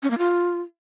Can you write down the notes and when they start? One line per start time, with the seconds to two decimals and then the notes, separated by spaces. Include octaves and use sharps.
0.03 C#4
0.10 A#3
0.18 F4